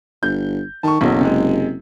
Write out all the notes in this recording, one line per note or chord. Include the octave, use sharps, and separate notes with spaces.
G1 G6
D#3 A5 C#6
F#1 B1 F#3
C3 G#3